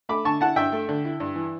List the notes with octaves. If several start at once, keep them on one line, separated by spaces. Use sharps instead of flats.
A3 B5 D6
D3 A5 C#6
E4 F#5 A5
G2 E5 G5
A3
D3
E4
G2
E3